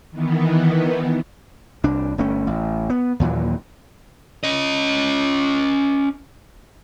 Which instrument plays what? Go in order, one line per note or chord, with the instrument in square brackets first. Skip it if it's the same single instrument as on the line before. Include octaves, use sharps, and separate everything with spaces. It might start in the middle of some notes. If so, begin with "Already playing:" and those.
[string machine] D#3 E3 B3
[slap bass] C2 D4
G1 A3 C#4
A1
B3
D#2 A#2 E3 F#3
[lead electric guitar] C#4 D#5